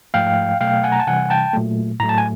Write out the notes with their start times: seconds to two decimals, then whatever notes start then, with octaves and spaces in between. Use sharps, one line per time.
0.14 G#2 F3 A3 F5 G5
0.61 B2 F#3 A3 F5 G5
0.84 F#5 G#5
0.92 A#5
1.00 A5
1.07 C3 E3 G3 F#5 G#5
1.30 G5 A5
1.53 A#2 F#3 A3
2.00 A2 F#3 A3 A#5
2.09 A5
2.18 G#5